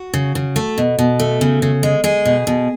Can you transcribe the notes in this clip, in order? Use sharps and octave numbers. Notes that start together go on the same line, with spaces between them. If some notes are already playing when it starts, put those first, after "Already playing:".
Already playing: F#4
C#3
C#3
A3
B2
B2
A3
C#3
C#3
G#3
G#3 G#4
B2
B2